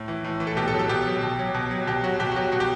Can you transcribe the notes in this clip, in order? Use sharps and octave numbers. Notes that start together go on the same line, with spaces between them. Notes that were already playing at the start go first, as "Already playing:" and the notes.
Already playing: A2
E3
A2
E3
A4
B2 G4
A4
F#3
A4
B2 G4
F#3
B2
F#3
B2
F#3
B2 G4
F#3 F#4
B2 G4
F#4
F#3 G4
B2 F#4
G4